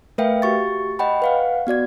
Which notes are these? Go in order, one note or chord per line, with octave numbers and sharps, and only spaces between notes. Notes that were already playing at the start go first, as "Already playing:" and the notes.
A3 A#4 B4 E5 F5 G5
F#4 G4 C#6 A6
D#5 F#5 G5 B5
B4 F5 F#5
B3 F#4 D5 G#6